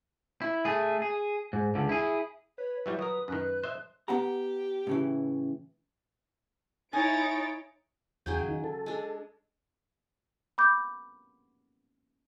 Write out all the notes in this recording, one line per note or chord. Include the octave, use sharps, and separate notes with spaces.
E4
A3 G#4
G#4
G#2
C#2 D3
E4 G#4
B4 C#5
E3 F#3 G3 E5
F#3 A#4 D#6
F#2 D#3 B4 F#6
C5 D#5 E5
B3 G4 F#5 A#5
A2 C#3 E3
D#4 E4 C#5 G#5 A6 D7
E2 C#3 F#3 G#4 G5
D#3
A4
G#3 D4
B5 D6 G6